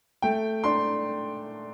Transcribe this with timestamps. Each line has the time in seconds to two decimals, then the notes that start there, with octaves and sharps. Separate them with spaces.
0.22 A3 G5
0.64 D4 C6